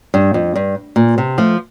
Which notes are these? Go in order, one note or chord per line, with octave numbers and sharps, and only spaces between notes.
G2
F2
G2
A#2
C3
F3 A3